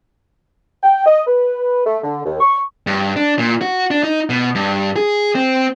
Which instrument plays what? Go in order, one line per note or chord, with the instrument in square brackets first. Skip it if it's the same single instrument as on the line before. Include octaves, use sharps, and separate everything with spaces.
[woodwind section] G5
D#5
B4
A3
D3
D#2
C#6
[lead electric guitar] G2
D4
A#2
F#4
D4
D#4
B2
G2
G#4
C4